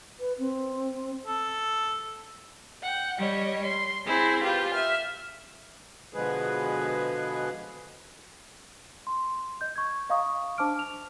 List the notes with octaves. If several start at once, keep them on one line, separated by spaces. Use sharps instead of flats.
B4
C4
A4
F#5 G5
G3 C#5 D#5
C6
C4 E4 G#4 C5
F4 G4 B4
E5 F6
B2 D3 F3 G#3 G#4 B4
C6
D#5 G6
C#6 G#6
D#5 F5 A#5 C#6 D#6
D4 C5 A5 D6 F6 D7
F7